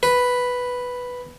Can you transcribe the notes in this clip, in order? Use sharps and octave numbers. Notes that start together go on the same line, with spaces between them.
B4